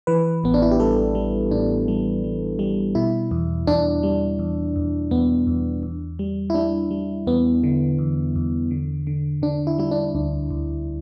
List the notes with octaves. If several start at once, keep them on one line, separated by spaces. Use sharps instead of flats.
E3 B4
A1 B3
D4
E4
G4
G3 A4
G3
A2 D4
G3
G3
G3
B2 E4
E2
E2 D4
G3
E2
E2
E2 B3
E2
E2
G3
E4
G3 D4
G3
E2 B3
D3
E2
E2
D3
D3
D3 D4
E4
G3 E4
D4
D2 D4
D2